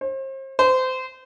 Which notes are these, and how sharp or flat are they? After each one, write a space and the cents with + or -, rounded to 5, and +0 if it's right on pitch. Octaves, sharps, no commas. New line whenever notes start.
C5 +40
C5 -25